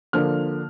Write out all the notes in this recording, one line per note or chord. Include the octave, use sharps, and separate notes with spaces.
D3 F3 A#3 D4 F6